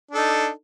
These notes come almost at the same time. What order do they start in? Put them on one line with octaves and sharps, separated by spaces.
D4 A4 D#4